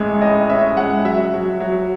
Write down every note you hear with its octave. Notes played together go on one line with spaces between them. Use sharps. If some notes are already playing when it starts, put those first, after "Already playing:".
Already playing: A1 G#3 C#4 E5
A2 D#5
C#4 E5
G#3 F#5
F#3 E5
F#3
F#3